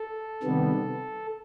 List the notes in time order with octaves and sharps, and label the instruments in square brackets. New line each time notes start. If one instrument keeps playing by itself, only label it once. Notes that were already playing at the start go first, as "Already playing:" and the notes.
Already playing: [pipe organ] A4
C3 D#3 G3 B3